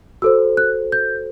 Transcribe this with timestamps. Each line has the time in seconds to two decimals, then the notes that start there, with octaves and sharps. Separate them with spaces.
0.22 F#4 A4 C5 E6
0.57 F#6
0.92 G6